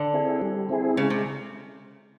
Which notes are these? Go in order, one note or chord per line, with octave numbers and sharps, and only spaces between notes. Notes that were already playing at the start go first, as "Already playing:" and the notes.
Already playing: D3
C4 E4 G#4
G3
C4 E4 G#4
C#3 G#3
C3